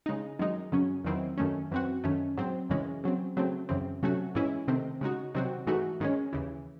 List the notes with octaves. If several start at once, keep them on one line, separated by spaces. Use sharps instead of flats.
C#3 G#3 D#4
F#2 D#3 G#3 D#4
F#2 C#3 F#3 C#4
E2 D#3 F#3 C4 E4
F#2 D#3 A3 C#4
F#2 E3 C4 F#4
F#2 D#3 A3 C#4
G#2 F#3 C4
F#2 C#3 E3 G#3 C#4
C#3 F#3 C4
C#3 F#3 A3 C4
F#2 C#3 E3 C4
C3 F#3 A3 C#4 F#4
G#2 E3 G#3 C#4 E4
C3 D#3 A3 C4
C#3 G#3 D#4 F#4
C3 D#3 F#3 C4 F#4
G#2 E3 A3 D#4 F#4
G#2 D#3 G#3 C#4
D#2 C#3 E3